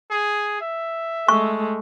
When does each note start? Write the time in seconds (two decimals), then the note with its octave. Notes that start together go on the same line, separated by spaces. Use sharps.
0.10 G#4
0.61 E5
1.28 G#3 A3 C#6